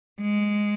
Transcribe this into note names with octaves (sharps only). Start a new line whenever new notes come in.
G#3